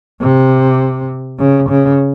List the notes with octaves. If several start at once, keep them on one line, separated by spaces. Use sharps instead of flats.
C3
C#3
C#3